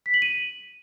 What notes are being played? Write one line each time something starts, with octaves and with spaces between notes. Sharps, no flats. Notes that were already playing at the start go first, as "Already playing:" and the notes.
B6
F#7
D#7